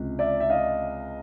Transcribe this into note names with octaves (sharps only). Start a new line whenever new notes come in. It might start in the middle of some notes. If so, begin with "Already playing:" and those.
Already playing: C#2 C3
D5 E5
E5
D#5 F5